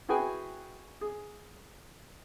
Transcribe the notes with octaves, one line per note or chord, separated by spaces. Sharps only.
E4 F#4 G#4 B4 G5 G#5
G#4